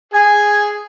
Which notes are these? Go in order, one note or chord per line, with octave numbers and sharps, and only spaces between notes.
G#4 G#5